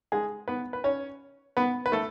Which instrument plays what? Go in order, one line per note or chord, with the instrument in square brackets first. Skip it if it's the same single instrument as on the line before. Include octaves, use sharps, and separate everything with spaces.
[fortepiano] G#3 G#4
B3 B4
B4
C#4 C#5
B3 B4
B4
A3 A4